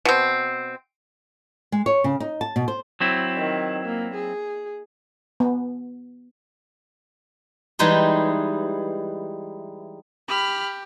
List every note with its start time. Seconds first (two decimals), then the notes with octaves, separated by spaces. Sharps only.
0.05 B2 C4
1.72 G#3
1.86 C#5
2.04 C#3
2.20 D#4
2.41 A5
2.56 B2
2.68 C5
3.00 F#3 C4 E4
3.36 D#3
3.85 A#3
4.15 G#4
5.40 B3
7.79 E3 G3 G#3 D#4 G#4
10.28 G4 B5 F6